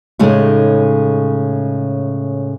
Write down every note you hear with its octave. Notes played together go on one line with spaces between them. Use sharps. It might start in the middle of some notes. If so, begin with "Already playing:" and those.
A2 C#3 G#3 A3 D#4